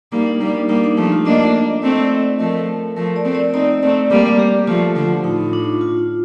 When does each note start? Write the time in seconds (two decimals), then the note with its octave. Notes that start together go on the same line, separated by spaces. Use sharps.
0.12 G3 A#3 D#4
0.26 D4
0.41 G3 A#3 D#4
0.55 D4
0.69 G3 A#3 D#4
0.84 D4
0.97 F3 A3 D#4
1.12 F4
1.26 A#3 D4 D#5
1.54 D5
1.83 A3 C4
2.39 F3 A3 A#4
2.97 F3 A3 A#4
3.16 D5
3.25 A3 C4
3.35 D5
3.53 C4 D#4 D5
3.82 A3 C4
4.10 G3 A#3
4.39 G4
4.67 F3 A3 F4
4.96 D3 F3
5.24 A2 D#4
5.53 D4
5.81 F4